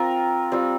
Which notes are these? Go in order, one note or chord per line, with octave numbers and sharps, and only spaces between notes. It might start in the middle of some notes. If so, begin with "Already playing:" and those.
Already playing: C4 F4 A#4
G3 C4 F4